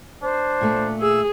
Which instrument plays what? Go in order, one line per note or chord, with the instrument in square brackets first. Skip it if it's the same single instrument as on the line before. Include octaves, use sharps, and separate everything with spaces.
[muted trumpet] D4 [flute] C5
[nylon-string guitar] A#2 A3 A5
[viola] G#4 [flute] E6